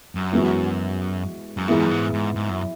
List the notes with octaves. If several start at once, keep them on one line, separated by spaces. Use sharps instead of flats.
F#2
E3 G#3 B3 F#4
F#2
G#2 E3 B3 E4 G#4
F#2
G#2
G#2
G#2
F#2